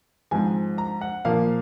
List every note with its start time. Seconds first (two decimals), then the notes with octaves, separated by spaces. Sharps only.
0.31 G#2 F3 C4 G#5
0.78 A#5
1.01 F#5
1.25 A#2 F3 A#3 F5